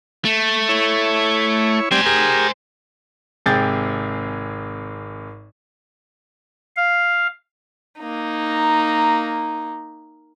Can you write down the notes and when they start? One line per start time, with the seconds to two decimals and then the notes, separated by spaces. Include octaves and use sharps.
0.25 A3
0.69 E4 C#5
1.91 G3 C4 C5 D5 G#5
2.06 G4 G#4 A#4
3.46 G#1 C3 G#4 G5 G6 A6
6.77 F5
7.99 A#3 D#4